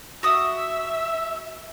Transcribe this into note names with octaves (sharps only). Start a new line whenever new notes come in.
F#4 E5 D#6